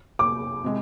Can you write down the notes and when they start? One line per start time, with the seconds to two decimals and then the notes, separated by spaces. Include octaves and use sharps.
0.19 D6
0.64 C3 G#3